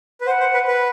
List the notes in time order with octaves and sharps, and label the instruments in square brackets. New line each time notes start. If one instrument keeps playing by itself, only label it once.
[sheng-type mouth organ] B4
[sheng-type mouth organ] C5 [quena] F#5
[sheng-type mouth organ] C5
B4
B4